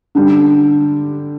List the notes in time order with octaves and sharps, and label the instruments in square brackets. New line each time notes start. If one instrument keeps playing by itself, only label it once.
[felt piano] D3 G3 D4 G4